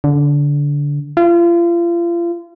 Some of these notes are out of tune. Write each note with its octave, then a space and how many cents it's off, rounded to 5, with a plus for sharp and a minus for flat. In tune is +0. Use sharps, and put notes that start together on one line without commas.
D3 -20
F4 -35